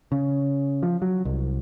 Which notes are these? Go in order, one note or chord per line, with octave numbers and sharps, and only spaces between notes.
C#3
F3
F#3
C2